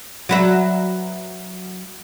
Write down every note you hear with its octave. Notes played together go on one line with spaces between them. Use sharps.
F#3 B4 E5